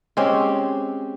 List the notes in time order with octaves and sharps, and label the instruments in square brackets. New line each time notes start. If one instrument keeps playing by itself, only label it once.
[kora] G#3 C4 C#4 G4